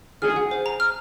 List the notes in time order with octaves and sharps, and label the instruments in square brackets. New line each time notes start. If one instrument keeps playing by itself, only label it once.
[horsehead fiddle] G#4 [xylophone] F6
[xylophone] F#5
C5
A#5
F6